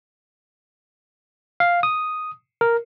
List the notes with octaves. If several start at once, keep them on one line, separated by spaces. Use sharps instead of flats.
F5
D#6
A#4